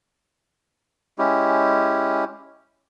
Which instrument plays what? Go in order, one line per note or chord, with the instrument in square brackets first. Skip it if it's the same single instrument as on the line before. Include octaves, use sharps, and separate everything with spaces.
[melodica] G#3 C#4 E4 G4